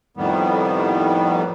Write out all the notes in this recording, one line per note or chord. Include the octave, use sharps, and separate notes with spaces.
F2 A2 D#3 G3 B3